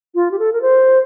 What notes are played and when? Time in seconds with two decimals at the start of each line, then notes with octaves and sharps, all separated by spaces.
0.15 F4
0.31 G4
0.39 A4
0.53 A#4
0.62 C5